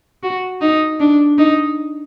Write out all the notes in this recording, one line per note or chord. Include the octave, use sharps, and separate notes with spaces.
F#4
D#4
D4
D#4